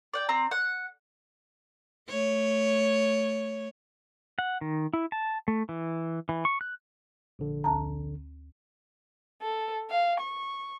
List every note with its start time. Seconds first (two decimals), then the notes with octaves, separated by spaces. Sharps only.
0.14 D5 F#5 G5
0.29 C4 A#5
0.51 F#5
2.09 A3 C#5
4.39 F#5
4.61 D#3
4.93 E4
5.12 A5
5.48 A3
5.69 E3
6.29 E3
6.45 C#6
6.61 F#6
7.39 A#1 D3
7.64 D2 A5 A#5
9.42 A4
9.90 F5
10.20 C#6